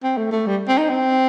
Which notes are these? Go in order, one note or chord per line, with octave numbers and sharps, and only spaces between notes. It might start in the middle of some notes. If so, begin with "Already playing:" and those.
C4
A3
A3
G3
C4
D#4
C4